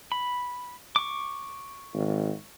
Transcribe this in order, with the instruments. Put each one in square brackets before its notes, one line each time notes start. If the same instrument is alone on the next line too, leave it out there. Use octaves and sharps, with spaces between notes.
[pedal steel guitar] B5
C#6 D6
[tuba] G#1